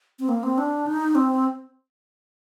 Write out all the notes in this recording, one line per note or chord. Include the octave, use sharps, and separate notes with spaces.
C4
A#3
C4
D4
D#4
C4